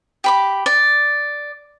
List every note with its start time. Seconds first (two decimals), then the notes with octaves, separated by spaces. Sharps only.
0.24 G4 B5 D6
0.66 D5